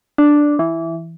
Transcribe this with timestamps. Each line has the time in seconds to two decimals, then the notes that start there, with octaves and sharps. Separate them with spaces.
0.18 D4
0.59 E3